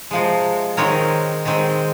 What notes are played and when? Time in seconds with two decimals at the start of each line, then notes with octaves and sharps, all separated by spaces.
0.11 C3 F3 G#3
0.77 D#3 G#3 C4 A#4 C#5
1.45 D#3 G#3 C4